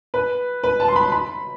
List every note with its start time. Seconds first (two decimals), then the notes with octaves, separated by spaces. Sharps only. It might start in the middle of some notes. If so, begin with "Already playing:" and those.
0.14 B4
0.63 B4
0.80 A5
0.88 C6
0.96 B5
1.12 B5